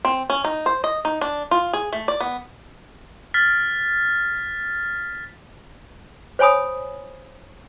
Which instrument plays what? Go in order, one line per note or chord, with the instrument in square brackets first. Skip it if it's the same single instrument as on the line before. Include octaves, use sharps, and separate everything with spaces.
[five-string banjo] C4
C#4
D#4
C5
D#5
D#4
D4
F4
G#4
A3
D5
B3
[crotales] F6 A6 B6
[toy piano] C5 C#5 G#5 B5 D#6